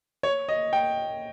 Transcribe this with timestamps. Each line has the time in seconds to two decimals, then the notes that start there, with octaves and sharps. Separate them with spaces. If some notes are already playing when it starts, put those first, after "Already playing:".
0.23 C#5
0.49 D#5
0.73 G5